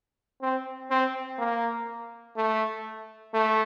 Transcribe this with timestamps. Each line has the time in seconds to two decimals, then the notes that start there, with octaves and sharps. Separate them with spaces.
0.42 C4
0.90 C4
1.39 A#3
2.36 A3
3.34 A3